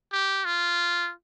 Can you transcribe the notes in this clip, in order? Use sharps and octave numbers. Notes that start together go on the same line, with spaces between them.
G4
F4